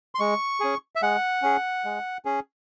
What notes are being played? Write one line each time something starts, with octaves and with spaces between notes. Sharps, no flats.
C6
G#3 C#6
C#4 G#4
E5
G#3 F#5
C#4 G#4
G#3
C#4 G#4